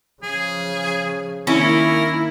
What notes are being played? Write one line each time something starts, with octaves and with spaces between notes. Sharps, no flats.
C#3 F3 G#4
D#3 A#3 C#4 E4 A#4